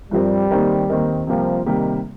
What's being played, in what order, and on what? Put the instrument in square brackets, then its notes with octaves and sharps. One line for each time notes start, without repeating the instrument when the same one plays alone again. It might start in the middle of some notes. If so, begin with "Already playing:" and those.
[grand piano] G2 F3 C4 G4 A#4 [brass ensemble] G3
[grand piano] D#2 D#3 C4 D#4 A#4
D#2 D#3 C4 D#4 A#4
[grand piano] C3 G3 A#3 G4 [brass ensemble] F3
[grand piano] C3 G3 A#3 G4 [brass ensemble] D#3